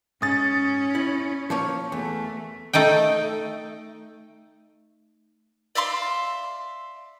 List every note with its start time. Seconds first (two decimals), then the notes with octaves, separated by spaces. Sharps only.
0.22 G#2 C#4 D#6 A6
0.95 E4
1.50 F3 A#3 C#5
1.92 E2 A3
2.73 A3 D#4 D#5 G5
5.75 D5 E5 F5 C6